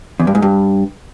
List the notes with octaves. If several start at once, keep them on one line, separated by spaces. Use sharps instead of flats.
E2
G2
G#2
G2